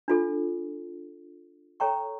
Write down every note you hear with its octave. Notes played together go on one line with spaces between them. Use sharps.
D4 F4 A4
A4 C#5 G5 A#5 C#6